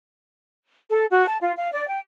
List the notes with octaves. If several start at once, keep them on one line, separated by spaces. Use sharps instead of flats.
A4
F#4
A5
F4
F5
D5
G5